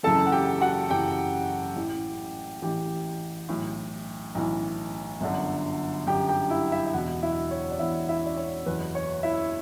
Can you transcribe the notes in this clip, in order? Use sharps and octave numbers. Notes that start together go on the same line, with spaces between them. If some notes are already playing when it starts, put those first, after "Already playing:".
F#1 F#2 C#3 E3 A4 A5
F#5
G4 G5
F#4 F#5
F#1 F#2 C#3 E3 G4 G5
A1 A2 E3
A1 A2 E3 G4 G5
B1 A2 E3
B1 A2 E3
G1 F#2 D3
G1 F#2 D3 G4 G5
G4 G5
E4 E5
E4 E5
E5
E1 E2 B2 F#4 F#5
E4 E5
C#5
D5
E1 E2 B2 E4 E5
E4 E5
D5
C#5
F#1 E2 B2 B4
C#5
E4 E5